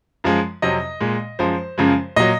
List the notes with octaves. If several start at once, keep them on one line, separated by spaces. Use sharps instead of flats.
F#2 F3 G#3
F2 C3 F#3 D#5
A#2 G#3
F#2 F3 G#3 C5
F#2 C#3 F3 G#3
A#2 F#3 D#5